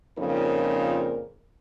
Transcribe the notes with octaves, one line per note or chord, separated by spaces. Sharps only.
F2 A#2 C#3 F3 D#4 A#4